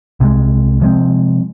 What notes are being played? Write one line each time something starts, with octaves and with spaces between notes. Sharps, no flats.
C2 C3 F3 G#3
C3 F3 G#3 C4